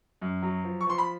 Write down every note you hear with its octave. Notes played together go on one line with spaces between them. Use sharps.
F#2
F#3
F3
C#6
F3 C6
B5